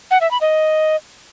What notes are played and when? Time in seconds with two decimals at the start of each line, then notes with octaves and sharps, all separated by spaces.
0.11 F#5
0.21 E5
0.31 B5
0.41 D#5